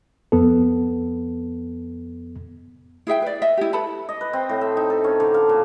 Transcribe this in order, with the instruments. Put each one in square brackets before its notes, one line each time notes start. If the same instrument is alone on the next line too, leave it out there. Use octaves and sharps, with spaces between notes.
[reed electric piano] F2 B3 A4
[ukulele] E4 G#4 E5 G5
B4 D5
D#5 E5
E4 G4
A4 B4 A5 B5
[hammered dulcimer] D#5
B4
C4
A2
E5
D#4
A4
C#4
D3
F5
A#2